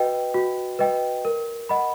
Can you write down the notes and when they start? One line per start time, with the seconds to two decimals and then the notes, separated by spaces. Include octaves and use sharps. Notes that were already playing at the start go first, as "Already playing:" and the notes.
Already playing: F#4 B4 D#5 G5
0.34 F#4
0.79 B4 D#5 G5
1.25 A#4
1.69 D#5 F#5 B5